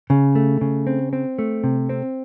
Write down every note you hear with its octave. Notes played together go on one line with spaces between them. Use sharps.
C#3
A3
C#3
C4
C4
A3
C3
C4